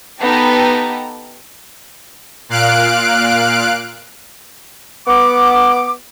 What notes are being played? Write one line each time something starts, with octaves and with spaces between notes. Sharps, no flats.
B3 D#4 G4 A4 A#5
A#2 F5 F#6 D7
B3 F#5 D6